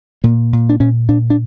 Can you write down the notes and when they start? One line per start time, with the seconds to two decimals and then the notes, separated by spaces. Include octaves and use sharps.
0.24 A#2 A#3
0.53 A#2
0.69 D4
0.80 A#2 C#4
1.08 A#2 D4
1.30 D4